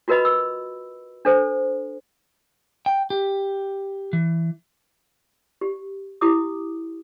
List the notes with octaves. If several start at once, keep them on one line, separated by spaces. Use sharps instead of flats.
F4 F#4 A#4 B4 D#5 B5
E6
D4 A4 C5
G5
G4
E3
G4
E4 G4 D6 D#6